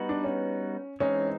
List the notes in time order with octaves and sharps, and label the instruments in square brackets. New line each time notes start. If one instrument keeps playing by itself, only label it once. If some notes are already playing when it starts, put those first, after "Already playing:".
Already playing: [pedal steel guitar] G3 B3 D#4 F#4 B4
[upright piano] D4
C#4
[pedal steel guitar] E3 G#3 C4 D#4 [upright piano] C#4